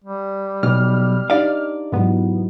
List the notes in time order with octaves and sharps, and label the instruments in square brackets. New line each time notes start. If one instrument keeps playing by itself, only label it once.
[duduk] G3
[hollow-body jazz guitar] B1 [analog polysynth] F6
[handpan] D4 D#4 G4 [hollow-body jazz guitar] D5 F5
[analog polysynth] G#2 B3 [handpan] E3 F#3